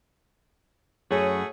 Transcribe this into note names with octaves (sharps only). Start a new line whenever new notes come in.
F#2 A3 F#4 G#4